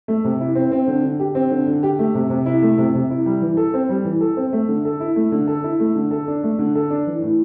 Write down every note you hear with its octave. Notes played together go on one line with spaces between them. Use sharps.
A3
C3
E4
C4
C4
D3
D3
G4
C4
D3
D3
G4
A3
C3
C3
E4
A3
C3
C3
E4
G3
E3
A4
C4
G3
E3
A4
C4
A3
D3
A4
E4
A3
D3
A4
E4
A3
D3
A4
D4
A3
D3
A4
D4
E3
A2